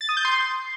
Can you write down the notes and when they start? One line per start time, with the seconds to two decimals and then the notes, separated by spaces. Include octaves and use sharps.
0.01 A6
0.09 D#6
0.17 G6
0.25 C6